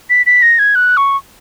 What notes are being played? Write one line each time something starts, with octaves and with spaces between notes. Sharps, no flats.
B6
B6
A#6
G#6
F#6
C#6